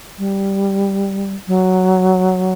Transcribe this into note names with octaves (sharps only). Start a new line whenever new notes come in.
G3
F#3